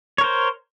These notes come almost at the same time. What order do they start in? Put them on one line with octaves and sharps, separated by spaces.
C#5 A#4 C5